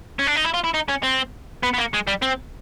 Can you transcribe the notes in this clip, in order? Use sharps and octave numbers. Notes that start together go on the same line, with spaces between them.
C#4
D4
D#4
E4
F4
E4
D#4
C#4
C4
B3
B3
A#3
G#3
G3
C4